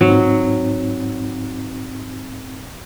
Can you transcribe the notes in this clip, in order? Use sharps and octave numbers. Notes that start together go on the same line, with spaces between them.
G#2 F#3 C4 D#4